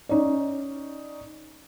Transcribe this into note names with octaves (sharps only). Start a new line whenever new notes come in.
C#4 D#4 C#5 D5